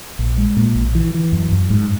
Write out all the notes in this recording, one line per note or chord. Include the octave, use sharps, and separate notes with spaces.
A#1
G#3
A#2
A#1
E3
E3
F#2
F#2
G#2